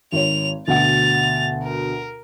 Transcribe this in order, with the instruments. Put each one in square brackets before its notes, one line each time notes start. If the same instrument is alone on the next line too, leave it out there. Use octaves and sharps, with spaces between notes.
[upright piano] G#1 C#5 [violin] F7
[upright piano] D2 B2 F#5 [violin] A6 F7
[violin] A#4